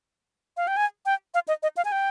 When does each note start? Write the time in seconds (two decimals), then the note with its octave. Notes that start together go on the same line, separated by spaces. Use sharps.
0.57 F5
0.67 G5
0.77 G#5
1.06 G5
1.34 F5
1.48 D#5
1.63 D#5
1.77 F5
1.85 G#5
1.92 G5